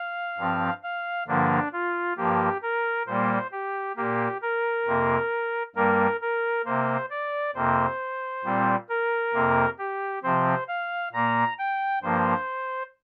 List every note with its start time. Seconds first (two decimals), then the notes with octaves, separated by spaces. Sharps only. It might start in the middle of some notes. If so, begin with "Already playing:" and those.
Already playing: F5
0.38 G2 F3 C4
0.83 F5
1.28 G2 D3 F3 A#3 D4
1.73 F4
2.17 G2 F3 A#3 G4
2.62 A#4
3.07 A#2 G3 A#3 C5
3.52 G4
3.97 A#2 A#3 G4
4.42 A#4
4.86 F2 C3 A#3
5.76 G2 G3 A#3 A#4
6.21 A#4
6.65 C3 A#3 C5
7.11 D5
7.55 F2 C3 A#3 C5
8.44 A#2 G3 C4
8.89 A#4
9.34 F2 C3 A#3
9.79 G4
10.23 C3 F3 C4 C5
10.68 F5
11.13 A#2 A#3 A#5
11.59 G5
12.02 G2 F3 A#3 C5